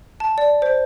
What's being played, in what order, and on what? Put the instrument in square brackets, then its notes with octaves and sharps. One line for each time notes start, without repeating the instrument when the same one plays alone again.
[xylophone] A5
D5
C5